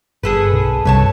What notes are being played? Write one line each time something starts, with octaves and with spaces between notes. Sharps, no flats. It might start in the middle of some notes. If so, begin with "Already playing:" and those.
G1 G#4 A4 B4
B1
C2 G2 B4 C#5 A5